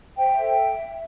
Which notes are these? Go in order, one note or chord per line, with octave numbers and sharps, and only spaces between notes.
C5 E5 G5
A4